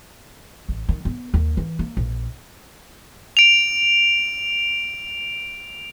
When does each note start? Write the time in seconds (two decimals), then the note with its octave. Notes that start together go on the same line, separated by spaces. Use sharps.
0.69 A1
0.89 D#3
1.05 B3
1.34 D#2
1.57 E3
1.79 A#3
1.97 A#1
3.37 D7 F7